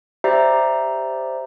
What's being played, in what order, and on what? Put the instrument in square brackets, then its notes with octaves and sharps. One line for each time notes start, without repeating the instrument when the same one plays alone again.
[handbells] G4 C5 D5 E5 A#5